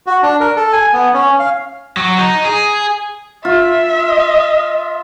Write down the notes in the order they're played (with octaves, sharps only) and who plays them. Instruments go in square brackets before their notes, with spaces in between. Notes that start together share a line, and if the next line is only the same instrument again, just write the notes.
[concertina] F#4
D4
A#4
A4
G#5
B3
C#4
F5
[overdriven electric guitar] F#3
D#4
G#4
[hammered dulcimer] F4 [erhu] E5